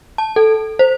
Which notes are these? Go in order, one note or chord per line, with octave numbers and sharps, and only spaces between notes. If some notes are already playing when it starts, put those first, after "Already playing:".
A5
A4
C5